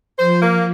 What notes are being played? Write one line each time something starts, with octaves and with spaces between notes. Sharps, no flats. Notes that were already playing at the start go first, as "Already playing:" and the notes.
F3 C5
A#3